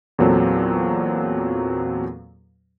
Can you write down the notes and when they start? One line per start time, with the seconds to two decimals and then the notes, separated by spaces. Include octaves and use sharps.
0.18 E2 A#2 F#3 C4 A4